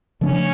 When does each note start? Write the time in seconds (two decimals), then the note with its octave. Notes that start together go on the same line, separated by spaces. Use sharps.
0.21 C#3 F3 A3 C#4 D4